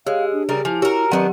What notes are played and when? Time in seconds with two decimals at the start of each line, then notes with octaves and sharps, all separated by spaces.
0.07 G#3 G4 F5
0.33 D4
0.49 C#3 G3 A#4
0.65 F3 E4 G#5
0.82 F#4 G4 A#4
1.11 D#3 F#3 B3 D4 D5 F#5